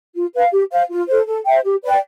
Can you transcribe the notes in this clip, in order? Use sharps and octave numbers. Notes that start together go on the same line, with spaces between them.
F4
B4 F5
G4
C5 F5
F4
A4 C5
A4
C5 E5 G5
G4
B4 D5 G5